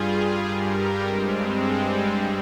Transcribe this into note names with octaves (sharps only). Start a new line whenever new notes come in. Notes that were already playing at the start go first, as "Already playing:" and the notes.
Already playing: G2 G3 F4 G#4
G2 G3 G4 A#4
G#3 C4
G2 G3